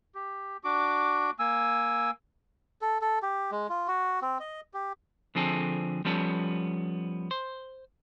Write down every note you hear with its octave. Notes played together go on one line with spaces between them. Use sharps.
G4
D4 F#4 D6
A#3 G#5 E6
A4
A4
G4
G#3
F4
F#4
C4
D#5
G4
D3 F3 C4 G#4 A4
F3 G3 B3 C#4 A4
C5